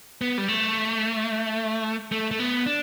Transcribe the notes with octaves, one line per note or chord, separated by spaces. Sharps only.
B3
G3
A3
A3
A3
B3
D4